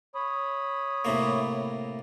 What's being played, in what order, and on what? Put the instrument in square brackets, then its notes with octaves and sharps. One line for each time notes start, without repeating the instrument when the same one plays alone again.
[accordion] C#5 B5 D#6
[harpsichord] A2 C3 A#3